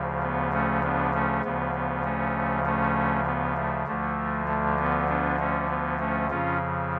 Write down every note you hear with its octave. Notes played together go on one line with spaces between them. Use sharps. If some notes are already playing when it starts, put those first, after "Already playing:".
Already playing: D2 C#3 F3
B3
A3 C#4
B3 D4
A3 C#4
D2 C#3 F3 B3
B3
A3 C#4
A3 C#4
B3
A3
D2 D3 F3 A3
A3
B3
B3 D4
A3 C#4
B3
A3 C#4
F2 C#3 F3 C#4 F4